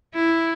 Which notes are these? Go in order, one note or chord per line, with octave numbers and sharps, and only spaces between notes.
E4